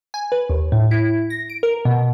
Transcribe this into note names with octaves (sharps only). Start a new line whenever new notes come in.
G#5
B4
D#2
A2
E4
A#6
D7
A#4
B2